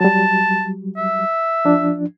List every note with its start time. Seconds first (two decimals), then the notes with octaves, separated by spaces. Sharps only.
0.01 F#3 G3 A5
0.97 E5
1.65 F3 D4